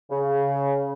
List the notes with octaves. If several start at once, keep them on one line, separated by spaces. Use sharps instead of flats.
C#3